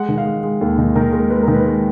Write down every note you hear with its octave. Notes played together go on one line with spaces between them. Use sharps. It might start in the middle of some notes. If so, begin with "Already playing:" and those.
Already playing: G#3 F#5
D#3
F5
G#3
G#3
D#2
D#3
D#3 A#4
G#3 A#4
G#3 B4
A#4
D#3
B4
G#3